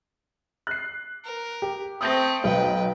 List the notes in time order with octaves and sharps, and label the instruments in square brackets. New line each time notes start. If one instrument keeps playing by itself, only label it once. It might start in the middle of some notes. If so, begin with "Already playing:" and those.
[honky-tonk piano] F#6 C7
[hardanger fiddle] A#4
[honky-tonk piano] G4
[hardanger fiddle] A3 C4 [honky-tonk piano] D#6 G6 A#6
[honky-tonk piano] B1 [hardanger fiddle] B4 G5